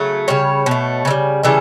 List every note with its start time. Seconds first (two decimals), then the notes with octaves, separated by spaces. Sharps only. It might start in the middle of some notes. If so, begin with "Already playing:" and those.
Already playing: C#3 F#3 A3
0.28 C#3 G3 C#5
0.66 B2 A3
1.05 C#3 E3
1.10 G3
1.43 C#3 E3 G3 A4